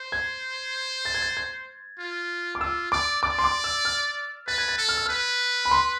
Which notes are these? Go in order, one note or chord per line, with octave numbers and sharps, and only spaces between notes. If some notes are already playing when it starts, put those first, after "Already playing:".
Already playing: C5
G#6
A6
G#6
A6
G#6
F4
D6
F4 E6
D5 D6
D5 D6
C6
D6
E6
F6
B4 A6
G#6
A6
A4
F6
E6
B4 F6
B5
C6